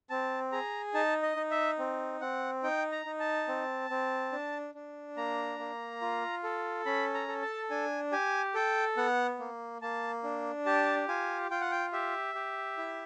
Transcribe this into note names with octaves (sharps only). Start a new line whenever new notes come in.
C4 A5
G#4 A#5
D#4 A5
D#5
D#4
E5
C4
C4 F#5
D#4 G5
A#5
D#4
A5
C4
C4
D4
D4
A#3 A#5
A#3
F4
A4
C#4 B5
A#5
A4
A5
D4 G#5
G4 G#5
A4 G5
B3 F#5
A#3
A#3 A5
D4
G4 A5
F4 G#5
F4 G5
F#5
G5
G4 E5
G4
E4